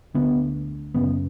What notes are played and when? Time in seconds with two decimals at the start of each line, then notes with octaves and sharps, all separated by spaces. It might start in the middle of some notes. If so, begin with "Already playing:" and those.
0.15 D2 D3 B3
0.95 F#2 C#3 B3